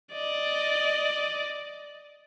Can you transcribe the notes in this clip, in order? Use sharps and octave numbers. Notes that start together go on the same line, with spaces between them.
D5 D#5